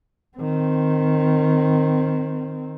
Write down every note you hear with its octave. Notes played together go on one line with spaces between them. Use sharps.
D#3 C4